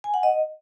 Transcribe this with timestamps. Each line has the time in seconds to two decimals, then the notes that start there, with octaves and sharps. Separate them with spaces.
0.04 G#5
0.14 F#5
0.23 D#5